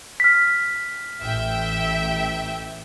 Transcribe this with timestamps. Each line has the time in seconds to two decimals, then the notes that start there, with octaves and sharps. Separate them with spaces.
0.20 F6 B6
1.20 A1 E5 G5